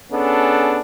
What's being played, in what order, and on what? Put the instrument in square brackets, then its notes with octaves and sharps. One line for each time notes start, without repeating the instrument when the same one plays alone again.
[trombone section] B3 C#4 D4 G#4 A4